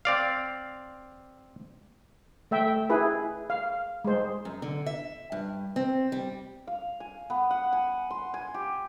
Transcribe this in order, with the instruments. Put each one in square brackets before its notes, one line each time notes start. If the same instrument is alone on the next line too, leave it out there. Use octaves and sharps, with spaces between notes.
[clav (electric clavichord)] C4 D5 F5
[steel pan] A3 E5 G5
E4 G#4 B4
F5
G#3 C5
[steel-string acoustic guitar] F#2
D3
E5
G2
C4
G3
[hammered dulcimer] F5
G#5
B3
F#5
G#5
C6
G#5
G4